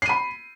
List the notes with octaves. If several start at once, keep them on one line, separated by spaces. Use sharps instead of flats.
B5 C7 D#7